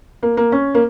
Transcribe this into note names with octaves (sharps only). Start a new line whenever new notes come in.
A#3
A#3
C#4
A#3